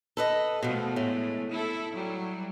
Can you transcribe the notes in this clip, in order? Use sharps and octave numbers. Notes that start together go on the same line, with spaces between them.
A4 B4 D#5
E2 B2 F3 G#3 A3
A2
E4 A4
F#3 G3